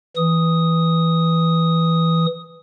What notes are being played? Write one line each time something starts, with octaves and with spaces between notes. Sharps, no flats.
E3 D#6